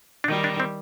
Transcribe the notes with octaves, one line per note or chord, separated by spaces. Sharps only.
D4
D#3 G3 D#4
D4
C4